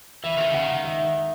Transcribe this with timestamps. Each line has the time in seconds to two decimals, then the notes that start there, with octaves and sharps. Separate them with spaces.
0.24 E3 E5
0.37 D#3
0.51 C#3 F#5
0.64 D#3
0.85 E5